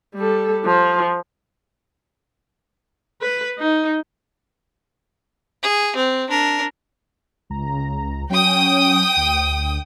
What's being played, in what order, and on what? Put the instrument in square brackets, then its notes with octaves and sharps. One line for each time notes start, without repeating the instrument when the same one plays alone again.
[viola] G3 A4
F3
B4
D#4
[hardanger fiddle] G#4
C4
D4 A#4
[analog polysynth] C#2 A#5
[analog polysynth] F#3 C#4 [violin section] G5 D#6
[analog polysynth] D2